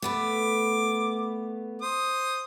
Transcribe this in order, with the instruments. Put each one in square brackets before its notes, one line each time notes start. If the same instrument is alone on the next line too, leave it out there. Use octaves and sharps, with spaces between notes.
[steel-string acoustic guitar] A3 B3 B4 [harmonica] D6
[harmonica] C5 D#6